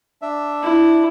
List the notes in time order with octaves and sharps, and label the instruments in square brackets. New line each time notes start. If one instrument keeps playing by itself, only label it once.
[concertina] D4 E5
[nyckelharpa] E4